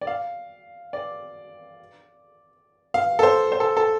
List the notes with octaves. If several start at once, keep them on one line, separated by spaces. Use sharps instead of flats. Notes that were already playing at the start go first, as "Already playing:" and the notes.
D5
F5
D5
F5
A4
C5
C5
A4
A4